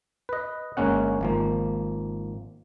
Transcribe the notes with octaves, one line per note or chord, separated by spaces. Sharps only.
B4 D#5
G1 G#3 A#3 C#4 F#5
G#1 F3 A#3